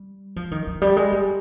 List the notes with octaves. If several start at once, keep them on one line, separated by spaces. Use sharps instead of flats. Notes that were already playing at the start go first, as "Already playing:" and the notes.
Already playing: G3
F3
D#3
F3
G3
G#3
G3